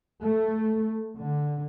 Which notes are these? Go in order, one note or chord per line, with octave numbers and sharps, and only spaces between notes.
A3
D3